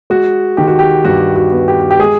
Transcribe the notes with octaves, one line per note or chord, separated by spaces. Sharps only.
G#3 F#4
D#3 G4
F#4
G4
G2 F#4
F#4
B3
G4
G4
G#3 G#4